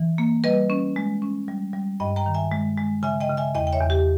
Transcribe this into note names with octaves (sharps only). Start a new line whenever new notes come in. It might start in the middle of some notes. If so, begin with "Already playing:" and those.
Already playing: E3
A#3
G3 B4 D#5
C#4
G#3
C#4
G3
G3
G2 D#5 G5
G5 A#5
D#3
E5 G#5
G#3
G#3
C#3 E5 G#5
D#5 G5
C#3
E5 G#5
E2 D#5 G5
G5
C#5 E5
E2
G4